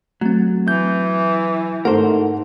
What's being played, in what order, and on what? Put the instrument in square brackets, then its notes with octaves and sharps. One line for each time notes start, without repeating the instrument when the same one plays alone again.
[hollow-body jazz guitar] F#3 [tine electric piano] A3 C4
[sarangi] E3 [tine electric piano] G6
[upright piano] G#2 A3 [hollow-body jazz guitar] A#4 C5 [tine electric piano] F#5